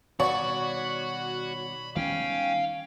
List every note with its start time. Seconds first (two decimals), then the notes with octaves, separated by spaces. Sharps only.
0.20 B2 D#3 G3 F#4 C#5 D5 B5
1.96 D#3 G3 B3 C#4 F5 G5